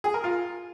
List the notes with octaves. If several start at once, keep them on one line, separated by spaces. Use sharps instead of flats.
G#4
A#4
F4